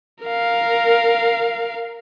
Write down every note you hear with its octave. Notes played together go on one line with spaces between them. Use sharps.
A#4 F5